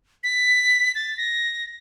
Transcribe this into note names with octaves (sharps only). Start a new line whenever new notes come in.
B6
A6
A#6